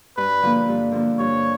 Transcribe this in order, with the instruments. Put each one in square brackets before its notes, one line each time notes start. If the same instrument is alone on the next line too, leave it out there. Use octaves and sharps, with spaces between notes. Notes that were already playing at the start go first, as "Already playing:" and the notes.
[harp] G2 [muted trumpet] B4
[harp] D3 F3 A#3
G2
D3 F3 A#3
[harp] G2 [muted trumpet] C#5